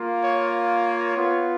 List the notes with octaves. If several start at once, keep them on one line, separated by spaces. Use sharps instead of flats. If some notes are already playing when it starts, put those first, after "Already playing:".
Already playing: A#3 F4
C#5
C#5
B3 F4